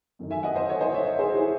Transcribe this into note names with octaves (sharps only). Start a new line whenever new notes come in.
F#2 D#3 A3 D#4
E5 G#5
D#5 F#5
C5 D#5
A4 C#5
C5 D#5
C#5 E5
G#4 C5
E4 G#4